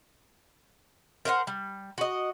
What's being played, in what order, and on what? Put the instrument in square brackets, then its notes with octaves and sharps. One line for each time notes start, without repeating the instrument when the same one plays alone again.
[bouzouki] A#4 C5 F5 F#5
G3
F#4 D#5